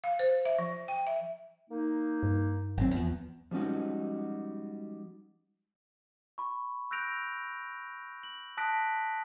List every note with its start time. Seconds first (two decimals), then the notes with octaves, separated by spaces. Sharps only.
0.04 F5
0.19 C5
0.45 E5
0.59 F3
0.88 G5
1.07 E5
1.70 A#3 D#4
2.23 G2
2.77 G#1 F#3 C4
2.94 E2 F3 B3
3.51 F3 G3 G#3 C#4 D#4 F#4
6.38 B5 C#6
6.91 E6 F#6 G6 A#6 D7 F7
8.23 F#7
8.57 A5 D#6 F#6 A#6 B6 D7